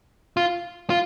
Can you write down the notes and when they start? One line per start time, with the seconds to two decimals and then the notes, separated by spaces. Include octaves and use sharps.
0.37 F4
0.90 F4